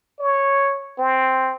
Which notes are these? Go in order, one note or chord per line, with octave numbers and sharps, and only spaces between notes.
C#5
C4